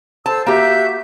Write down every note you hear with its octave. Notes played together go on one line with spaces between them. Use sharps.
A4 C5 A5 E6
A#3 F#4 G4 E5 G6